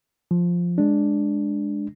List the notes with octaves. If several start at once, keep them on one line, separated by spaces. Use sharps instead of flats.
F3
G#3 D4